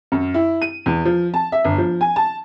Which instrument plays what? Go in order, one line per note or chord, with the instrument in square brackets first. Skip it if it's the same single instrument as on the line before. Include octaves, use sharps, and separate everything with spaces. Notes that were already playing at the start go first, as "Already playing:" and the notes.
[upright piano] F#2
E4
D#7
E2
F3
A5
E5
G1
F3
G#5
A5